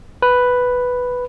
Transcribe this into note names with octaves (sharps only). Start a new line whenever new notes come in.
B4